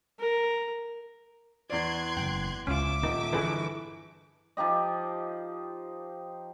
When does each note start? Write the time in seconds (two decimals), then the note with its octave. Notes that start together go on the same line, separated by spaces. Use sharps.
0.19 A#4
1.70 E2 D5 C6 F#6 G#6
2.17 F#1 G5
2.67 C#2 C#4 F4 E5 D6 D7
3.03 D#1 D#4 F4
3.33 G1 E3 G#4 A4 B4
4.57 F3 D#4 G4 D#5